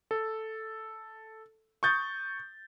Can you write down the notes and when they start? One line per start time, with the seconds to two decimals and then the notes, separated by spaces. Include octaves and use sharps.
0.11 A4
1.83 C#6 D#6 G6 A6